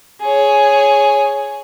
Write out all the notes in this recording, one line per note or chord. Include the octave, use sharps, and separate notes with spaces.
G#4 C#5